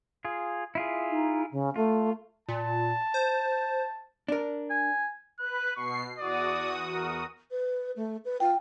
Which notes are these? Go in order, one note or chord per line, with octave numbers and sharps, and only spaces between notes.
F4 G#4
E4 F4 G#4
D#4
C#3
A3 F4
A#2 A5
C5
D4 A#4
G#5
B4 F#6
B2 C#6 C7
E2 F#4 D5 D#6
A#4
B4
A3
B4
F4 G5